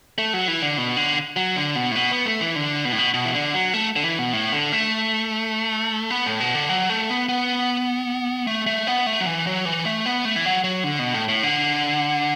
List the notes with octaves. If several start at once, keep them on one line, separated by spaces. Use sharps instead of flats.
A3
F#3
E3
D3
B2
D3
F#3
D3
B2
A2
B2
B3
A3
E3
D3
B2
A2
B2
B2
E3
D3
F#3
A3
D3
E3
B2
A2
D3
A3
B3
A2
B2
D3
F#3
A3
B3
B3
A3
A3
B3
A3
F#3
E3
F#3
E3
A3
B3
A3
E3
F#3
F#3
D3
B2
A2
A2
D3